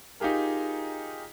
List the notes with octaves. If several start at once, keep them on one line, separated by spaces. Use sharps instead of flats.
D#4 F4 G4 G#4 A#4